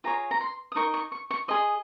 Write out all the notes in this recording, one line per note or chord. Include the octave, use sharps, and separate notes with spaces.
F4 G#4 C#5 A#5
A#5
C6
D#6
D#4 A#4 D#5 C#6
C#6
C#6
C#6
G#4 D#5 C6